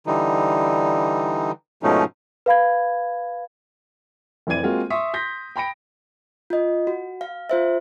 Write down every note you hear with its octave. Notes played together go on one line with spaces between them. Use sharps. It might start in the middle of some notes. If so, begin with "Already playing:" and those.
D3 E3 G3 D#4
G#2 B2 F3 A3 C#4 D#4
B4 F5 B5 G#6
F1 E3 C4 D5 G#6 D#7
G#3 A#3 C4 F4 F#4
E5 C6 C#6 D#6 B6
C6 G6 A#6 B6
G5 B5 A#6 D7
F4 D#5
F#4
F5
F4 C5 E5